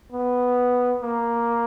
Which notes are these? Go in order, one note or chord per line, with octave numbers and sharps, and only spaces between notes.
B3
A#3